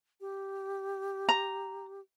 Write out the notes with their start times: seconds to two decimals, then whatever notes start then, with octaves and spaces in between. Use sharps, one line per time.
0.21 G4
1.29 A#5